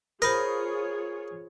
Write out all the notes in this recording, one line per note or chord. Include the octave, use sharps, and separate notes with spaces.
F4 G#4 A#4 C5 C#5 B5 D#6 A#6